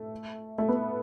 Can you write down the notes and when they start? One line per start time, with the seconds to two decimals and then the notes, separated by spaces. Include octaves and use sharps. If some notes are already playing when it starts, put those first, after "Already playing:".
Already playing: A3
0.58 A3
0.68 B3